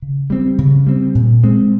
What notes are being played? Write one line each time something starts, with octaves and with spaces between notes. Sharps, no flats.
C#3
G3 C4
C#3
G3 C4
A#2
G#3 C4